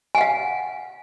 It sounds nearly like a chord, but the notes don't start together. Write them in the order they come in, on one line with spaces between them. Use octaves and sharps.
G#5 F#5 F5